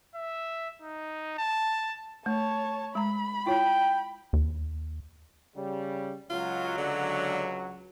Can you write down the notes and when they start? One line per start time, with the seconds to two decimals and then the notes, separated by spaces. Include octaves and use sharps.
0.15 E5
0.82 D#4
1.38 A5
2.26 A3 C#5 A5
2.95 G#3 A#5 B5
3.46 E4 F4 C#5 G5
4.33 D#2
5.56 C#3 G3
6.30 C#2 F#3 F4
6.78 D3